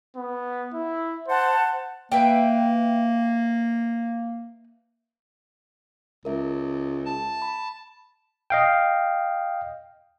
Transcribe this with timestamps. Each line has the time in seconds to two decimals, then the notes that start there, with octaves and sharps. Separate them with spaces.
0.16 B3
0.74 E4
1.28 C5 F#5 A5
2.12 A#3 B4 E5 G5
6.25 C#2 A#4 E5
7.05 A5
7.42 B5
8.50 D#5 F5 G5